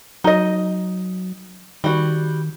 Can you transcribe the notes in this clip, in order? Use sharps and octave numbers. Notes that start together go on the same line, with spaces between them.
F#3 D#4 D#5
D#3 G3 F#4